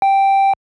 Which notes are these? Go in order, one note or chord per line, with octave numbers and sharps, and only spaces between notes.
G5